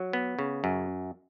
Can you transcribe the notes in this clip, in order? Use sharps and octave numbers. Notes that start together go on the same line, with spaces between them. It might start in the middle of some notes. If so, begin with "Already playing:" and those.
Already playing: F#3
B3
C#3
F#2